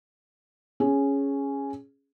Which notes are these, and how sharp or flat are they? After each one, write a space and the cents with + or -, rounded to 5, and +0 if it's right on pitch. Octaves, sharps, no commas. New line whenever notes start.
C#4 +0 G#4 +0